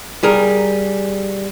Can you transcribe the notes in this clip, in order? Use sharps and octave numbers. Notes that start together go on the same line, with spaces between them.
G3 G#4 A#4